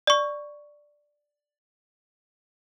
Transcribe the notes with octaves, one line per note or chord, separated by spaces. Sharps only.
D5 C#6